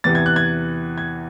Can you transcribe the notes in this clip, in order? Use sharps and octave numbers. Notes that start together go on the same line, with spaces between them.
E2 C3 E3 A6
G#6
F#6
G#6
G#6